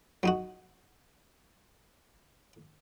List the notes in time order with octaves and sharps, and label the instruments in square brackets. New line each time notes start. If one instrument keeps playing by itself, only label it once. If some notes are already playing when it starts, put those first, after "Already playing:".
[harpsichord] F#3 D#4 F#4